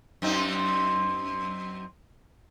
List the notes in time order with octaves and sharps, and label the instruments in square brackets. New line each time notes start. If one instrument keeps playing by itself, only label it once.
[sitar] F#2 C4 D#4